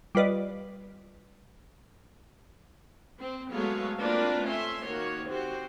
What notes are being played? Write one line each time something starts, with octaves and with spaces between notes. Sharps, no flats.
G3 F4 B4 D5 D#5
C4
F#3 G#3 A3 B3 C#5 F5
A#3 C4 D4 F4 A#4 B4
A3 C#4 E5 C6
D#3 A#3 F#4 C#5
C4 F#4 G4 C5